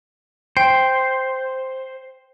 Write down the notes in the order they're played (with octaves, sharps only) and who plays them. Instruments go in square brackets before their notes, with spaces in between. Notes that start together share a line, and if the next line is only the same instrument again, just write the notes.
[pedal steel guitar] C5 [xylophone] G5